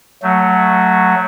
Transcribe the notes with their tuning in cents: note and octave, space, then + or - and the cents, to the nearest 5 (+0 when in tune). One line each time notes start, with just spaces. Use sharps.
F#3 +0 A3 +10